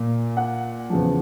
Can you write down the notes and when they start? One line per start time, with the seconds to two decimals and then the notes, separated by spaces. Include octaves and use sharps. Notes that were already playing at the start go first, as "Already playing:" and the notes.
Already playing: A#2 A#3
0.37 F#5
0.90 E2 C#3 F3